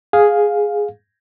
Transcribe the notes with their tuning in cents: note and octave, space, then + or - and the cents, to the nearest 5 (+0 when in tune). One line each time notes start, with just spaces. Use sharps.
G#4 +0 F5 +10